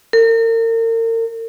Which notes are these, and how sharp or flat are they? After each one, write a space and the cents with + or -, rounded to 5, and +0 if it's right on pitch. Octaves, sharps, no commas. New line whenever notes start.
A#4 -40